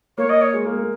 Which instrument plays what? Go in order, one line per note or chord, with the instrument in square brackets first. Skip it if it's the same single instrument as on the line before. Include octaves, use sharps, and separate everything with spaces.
[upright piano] A#3 [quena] C#5
[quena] D#5
C#5
[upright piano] G#3
A#3
A#3